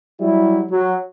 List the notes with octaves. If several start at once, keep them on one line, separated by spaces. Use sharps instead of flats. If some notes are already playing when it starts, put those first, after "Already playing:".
F#3 G3 E4
F#3